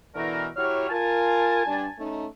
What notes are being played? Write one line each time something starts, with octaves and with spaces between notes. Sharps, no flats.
B2 D3 E3 A3 A#4
F#3 E4 G4 C#5 F6
F4 A#4 G#5 A5
G2 G3 D4
A3 C#4 D#4